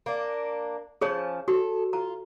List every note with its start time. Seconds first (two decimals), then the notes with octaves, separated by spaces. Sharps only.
0.06 A#3 D4
1.01 F3 C#4 G#4 C#5 A5
1.48 F#4 A4
1.93 F4 A#5